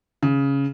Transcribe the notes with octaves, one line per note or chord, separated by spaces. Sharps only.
C#3